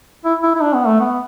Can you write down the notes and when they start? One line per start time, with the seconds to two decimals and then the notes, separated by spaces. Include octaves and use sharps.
0.25 E4
0.43 E4
0.55 E4
0.62 D4
0.74 B3
0.87 A3
1.00 B3